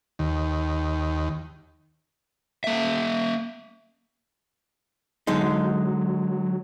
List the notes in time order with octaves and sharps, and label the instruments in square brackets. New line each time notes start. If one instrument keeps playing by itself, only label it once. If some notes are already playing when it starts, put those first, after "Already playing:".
[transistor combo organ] D#2
[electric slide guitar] A#3 E5
[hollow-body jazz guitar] D3 G#3 D#4 [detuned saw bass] F#3